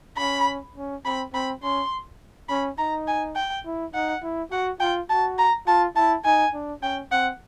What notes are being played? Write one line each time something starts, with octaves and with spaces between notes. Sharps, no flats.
C#4 B5
C#4
C4 B5
C4 B5
C#4 C6
C#4 B5
D#4 A#5
G#5
G5
E4
D#4 F#5
E4
F#4 F#5
F4 G5
F#4 A5
A#5
F4 A5
E4 A5
D#4 G#5
D4
C#4 G5
C4 F#5